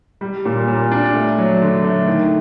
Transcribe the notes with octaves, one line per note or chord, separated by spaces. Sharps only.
G3
A#2
A#2
D4
A3
F#3
D3
A3
D#3